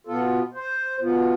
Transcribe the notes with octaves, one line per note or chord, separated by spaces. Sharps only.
B2 B3 F4 A4
C5
B2 B3 F4